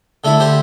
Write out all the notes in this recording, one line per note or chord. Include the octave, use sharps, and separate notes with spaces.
D3 A3 E4 A4
G4 C5